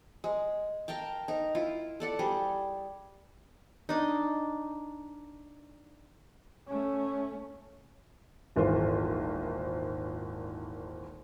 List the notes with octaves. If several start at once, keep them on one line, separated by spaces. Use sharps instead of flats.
G#3
A#4 F5 G5 A5
D#4 A#4
E4 F4
A4 D5 F#5
G3 G#4
D4 D#4
A3 C#4
D#1 G#1 E3 F4 C5